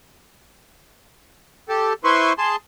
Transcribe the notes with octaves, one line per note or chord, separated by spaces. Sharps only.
G4 A4
E4 B4 C5 C6 C#6
G#4 A5 C6